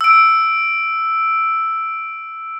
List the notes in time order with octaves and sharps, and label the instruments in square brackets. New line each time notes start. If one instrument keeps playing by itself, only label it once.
[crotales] E6 D7